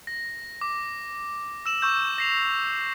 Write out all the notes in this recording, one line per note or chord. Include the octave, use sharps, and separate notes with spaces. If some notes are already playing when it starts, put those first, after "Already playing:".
A#6
D6
E6 E7 F#7
C#6 E6 G6
A#6 C7 F7